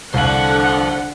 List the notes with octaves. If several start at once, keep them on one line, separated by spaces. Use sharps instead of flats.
C2 D3 C5 F5 F#5 F#7